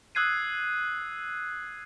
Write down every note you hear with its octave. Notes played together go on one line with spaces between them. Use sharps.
D#6 E6 F#6 G#6 C7 D#7